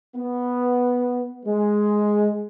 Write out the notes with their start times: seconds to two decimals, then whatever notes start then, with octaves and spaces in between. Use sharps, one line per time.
0.15 B3
1.45 G#3